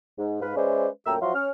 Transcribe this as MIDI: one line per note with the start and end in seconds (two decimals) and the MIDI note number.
0.18 0.39 44
0.42 0.55 44
0.42 0.55 71
0.42 0.55 77
0.56 0.88 56
0.56 0.88 61
0.56 0.88 71
0.56 0.88 72
0.56 0.88 74
0.56 0.88 76
1.06 1.16 42
1.06 1.16 46
1.06 1.16 57
1.06 1.16 79
1.06 1.16 82
1.06 1.16 88
1.21 1.33 53
1.21 1.33 54
1.21 1.33 66
1.21 1.33 76
1.21 1.33 77
1.21 1.33 84
1.33 1.50 61
1.33 1.50 73
1.33 1.50 89